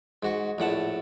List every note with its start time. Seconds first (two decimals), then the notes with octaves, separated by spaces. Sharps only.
0.23 G#2 F#4 C#6
0.58 A#1 A2 F#5 A5